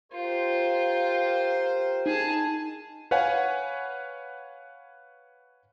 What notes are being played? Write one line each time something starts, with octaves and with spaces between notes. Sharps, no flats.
F4 G4 A#4 C5
D#4 G#4 A5
B4 C#5 F5 F#5 G#5